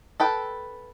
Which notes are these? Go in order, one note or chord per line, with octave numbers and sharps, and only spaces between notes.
A4 B4 G5